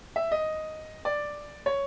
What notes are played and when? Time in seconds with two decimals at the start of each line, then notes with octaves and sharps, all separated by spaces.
0.16 E5
0.32 D#5
1.05 D5
1.66 C#5